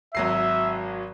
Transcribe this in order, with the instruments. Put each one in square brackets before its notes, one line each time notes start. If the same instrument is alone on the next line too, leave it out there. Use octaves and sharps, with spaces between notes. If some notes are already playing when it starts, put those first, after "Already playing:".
[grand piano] G#1 F#3 C7 [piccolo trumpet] E5